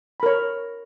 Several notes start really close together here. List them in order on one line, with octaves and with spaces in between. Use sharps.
B5 A#4 C#5